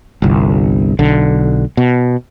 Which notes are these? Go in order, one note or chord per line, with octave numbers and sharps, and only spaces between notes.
G1 C2
B1 D3
B2